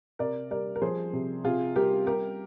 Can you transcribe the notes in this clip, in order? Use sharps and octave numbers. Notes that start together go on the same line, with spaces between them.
C3 A#4 D5
G3 A#4 D5
A#4
F3 G#4 C5
C3
C3 F4 G#4
G3 G4 A#4
G3 G4 A#4